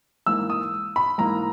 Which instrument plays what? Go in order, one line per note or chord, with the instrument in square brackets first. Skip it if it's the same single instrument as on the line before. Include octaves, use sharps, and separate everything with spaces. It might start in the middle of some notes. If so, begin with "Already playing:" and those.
[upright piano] G#2 E3 A#3 E6
D#6
B5
G#2 E3 A#3 A#5